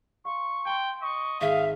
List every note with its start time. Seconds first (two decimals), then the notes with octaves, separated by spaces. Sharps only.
0.25 F5 C6 C#6
0.66 G5 A5 C6
1.02 D#5 C#6
1.41 G#1 E5 F5